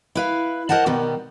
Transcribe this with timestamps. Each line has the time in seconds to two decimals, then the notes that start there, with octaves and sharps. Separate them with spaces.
0.15 E4 B4 F5
0.69 A#4 C5 D#5 F#5 A5
0.86 B2 D#3 G3 B3